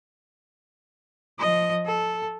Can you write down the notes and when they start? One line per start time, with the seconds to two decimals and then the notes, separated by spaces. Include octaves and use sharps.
1.40 F3 D#5
1.86 A4